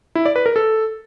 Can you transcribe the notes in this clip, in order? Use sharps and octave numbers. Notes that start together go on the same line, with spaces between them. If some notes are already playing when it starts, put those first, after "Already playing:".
E4
D5
B4
A#4
A4